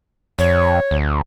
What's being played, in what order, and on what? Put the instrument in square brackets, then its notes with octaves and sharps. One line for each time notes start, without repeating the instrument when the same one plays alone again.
[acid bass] F2 [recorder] C#5
[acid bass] D2